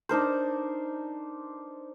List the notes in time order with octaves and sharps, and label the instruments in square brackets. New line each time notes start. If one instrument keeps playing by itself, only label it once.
[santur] D4 D#4 A#4 C5